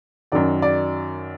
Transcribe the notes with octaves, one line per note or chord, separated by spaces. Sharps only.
F#2 D#3 F#3 D5
D5